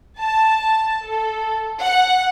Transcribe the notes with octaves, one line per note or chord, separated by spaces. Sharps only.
A5
A4
F#5